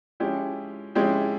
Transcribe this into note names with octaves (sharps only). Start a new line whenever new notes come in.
F3 G#3 C#4 E4 G4
F3 G#3 C#4 E4 G4